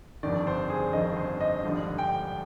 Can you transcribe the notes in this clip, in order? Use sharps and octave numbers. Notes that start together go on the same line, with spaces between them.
G1 F2 D#3 D5
C5
G#4
G1 F2 D#3 D#5
C5
D#5
G#1 G2 D3 F3
G5